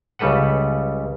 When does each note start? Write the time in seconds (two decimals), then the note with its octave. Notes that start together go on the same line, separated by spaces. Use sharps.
0.19 C#2 C#3 G3 A4 B4 F#5